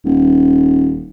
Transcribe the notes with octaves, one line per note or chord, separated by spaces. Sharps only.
D#1